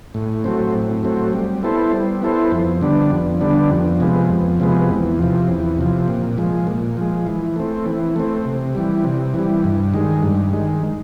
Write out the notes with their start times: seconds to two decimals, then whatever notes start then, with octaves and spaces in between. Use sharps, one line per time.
0.14 A2
0.44 F#3 A3 C4
0.74 A2
1.03 F#3 A3 C4
1.33 G3
1.63 B3 E4 A4 C5
1.93 G3
2.22 B3 E4 A4 C5
2.52 F2
2.81 D3 G3 B3 D4
3.11 F2
3.41 D3 G3 B3 D4
3.71 F2
4.00 C3 F3 G#3 B3
4.30 F2
4.60 C3 F3 G#3 B3
4.89 E2
5.19 C3 F3
5.48 E2
5.78 C3 F3
6.08 A#2
6.37 F3 G#3
6.67 A#2
6.97 F3 G#3
7.26 E3
7.56 A3 C4
7.86 E3
8.16 A3 C4
8.45 C3
8.75 E3 G3
9.04 C3
9.34 E3 G3
9.64 G2
9.94 D#3 G#3
10.23 G2
10.53 D#3 G#3